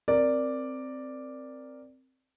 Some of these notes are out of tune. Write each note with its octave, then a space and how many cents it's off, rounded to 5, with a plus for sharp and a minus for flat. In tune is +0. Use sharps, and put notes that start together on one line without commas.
C4 +0 A#4 -5 D5 +0